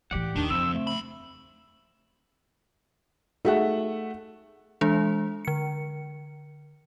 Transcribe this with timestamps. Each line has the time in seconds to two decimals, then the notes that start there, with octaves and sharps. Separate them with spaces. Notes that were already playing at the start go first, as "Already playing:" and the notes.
0.11 A2 E3 G4 D5 F#5
0.36 D#2 D#3 A#3 D4
0.50 F2 C#3 C4 E6
0.73 A3
0.87 C2 B5
3.45 A3 D#4 F#4 G#4 E5 F#5
4.81 E3 G#3 D4 A4
5.45 D3 C#7